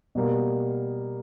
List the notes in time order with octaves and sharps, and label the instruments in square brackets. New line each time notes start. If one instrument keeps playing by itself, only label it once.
[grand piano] B2 G3 A#3